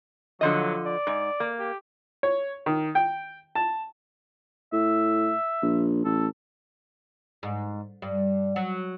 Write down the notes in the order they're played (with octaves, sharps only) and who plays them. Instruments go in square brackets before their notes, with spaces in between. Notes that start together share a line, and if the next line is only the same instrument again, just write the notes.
[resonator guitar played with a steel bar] D3 F3 D#5 [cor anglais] F#3
[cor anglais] D5
[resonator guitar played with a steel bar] G#2
A#3
[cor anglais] G4
[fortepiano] C#5
D#3
G5
A5
[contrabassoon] A2 [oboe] E5
[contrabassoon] A#1
[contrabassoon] A1 [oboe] A4
[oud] G#2
G2
F#3